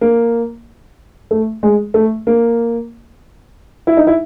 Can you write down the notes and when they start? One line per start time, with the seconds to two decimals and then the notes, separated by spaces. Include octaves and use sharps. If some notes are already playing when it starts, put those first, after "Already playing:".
0.01 A#3
1.31 A3
1.63 G#3
1.94 A3
2.27 A#3
3.87 E4
3.97 D#4
4.07 E4